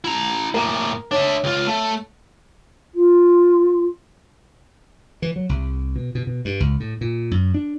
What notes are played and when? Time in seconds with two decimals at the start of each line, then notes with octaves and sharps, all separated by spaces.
0.04 E4 A#5
0.54 A2 A#3 A#4 A#5
1.11 D4 C#5 E5
1.44 C#2 F4
1.67 A3
2.95 F4
5.22 E3
5.36 F#3
5.49 C2
5.96 B2
6.15 B2
6.27 B2
6.45 G2
6.60 C#2
6.80 A2
7.01 A#2
7.31 F#2
7.54 D4